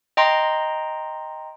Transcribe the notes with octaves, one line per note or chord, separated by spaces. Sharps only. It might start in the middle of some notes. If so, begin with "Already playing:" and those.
D#5 G5 A#5 C6